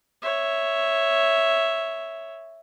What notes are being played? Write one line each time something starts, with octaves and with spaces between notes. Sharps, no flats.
C#5 E5